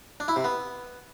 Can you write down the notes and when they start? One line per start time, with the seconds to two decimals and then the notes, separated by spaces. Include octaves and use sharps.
0.20 D4
0.28 E4
0.36 C3
0.44 B3